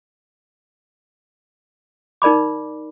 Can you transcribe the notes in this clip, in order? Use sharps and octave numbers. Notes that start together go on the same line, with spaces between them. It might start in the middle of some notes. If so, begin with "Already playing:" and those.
D#4 A#4 D5 B5 D6